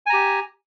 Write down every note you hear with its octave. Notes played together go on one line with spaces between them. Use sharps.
G4 G#5 A#5